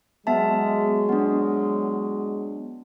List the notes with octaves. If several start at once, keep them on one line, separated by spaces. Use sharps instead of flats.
F#3 G#3 B3 E5 A5
B3 D4